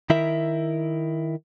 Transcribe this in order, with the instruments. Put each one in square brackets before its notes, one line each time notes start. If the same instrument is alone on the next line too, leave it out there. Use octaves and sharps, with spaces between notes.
[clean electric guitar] D#3 E4 A#4 E5